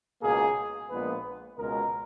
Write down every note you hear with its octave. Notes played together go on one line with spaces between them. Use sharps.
C#2 B2 A#3 G#4
A#1 A#2 G#3 B3 B4
C#2 B2 G#3 A#4